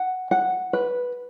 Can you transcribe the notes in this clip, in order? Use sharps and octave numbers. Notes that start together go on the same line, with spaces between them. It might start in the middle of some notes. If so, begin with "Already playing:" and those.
Already playing: F#5
F#5
B4